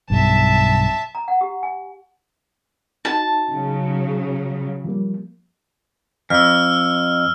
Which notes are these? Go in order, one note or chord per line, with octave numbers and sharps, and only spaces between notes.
B1 G2 E5 A5
A#5
F#5
G4
G#5
D#4 F#4 A5
C#3 F#3
F3 G3 A#3
F2 E6 F6